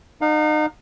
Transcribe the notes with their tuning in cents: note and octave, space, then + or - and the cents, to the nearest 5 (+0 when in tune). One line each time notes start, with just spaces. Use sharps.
D#4 -30 F5 +35